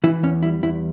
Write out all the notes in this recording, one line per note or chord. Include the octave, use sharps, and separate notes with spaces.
E3 E4
E2 C#4
G3 E4
E2 E4